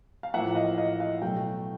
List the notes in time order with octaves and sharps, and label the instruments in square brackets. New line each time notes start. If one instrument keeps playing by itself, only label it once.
[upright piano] F5
A2 F3 A#3 E5 F#5
D#5 F5
D#5 F5
D#5 F5
B2 F#3 A3 F5 G5